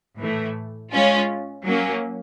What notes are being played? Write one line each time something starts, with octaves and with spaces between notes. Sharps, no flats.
A2 E3 A3
G#3 C#4 F4
F#3 A#3 C#4